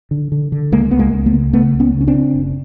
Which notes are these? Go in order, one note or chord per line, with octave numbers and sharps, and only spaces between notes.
D3
D3
D3
C#2 G#3 A#3
C#2 B3
G#3 A#3
C#2
A3 B3
C#3
C#3 A3 B3
C#2
B3 C#4
C#3
C#4
C4 D4
C#3
F#1